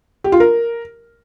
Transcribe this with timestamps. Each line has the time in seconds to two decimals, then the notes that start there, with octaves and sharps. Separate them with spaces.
0.24 G4
0.32 F4
0.40 A#4